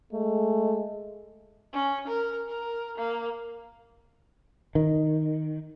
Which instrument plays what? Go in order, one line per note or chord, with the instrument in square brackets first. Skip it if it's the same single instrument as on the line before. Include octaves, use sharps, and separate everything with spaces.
[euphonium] G#3 [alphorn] A3
[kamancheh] C#4
A#4
A#4
A#3
[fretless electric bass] D#3